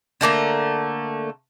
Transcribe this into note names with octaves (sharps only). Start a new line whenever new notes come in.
D3 A3 A#3 A#5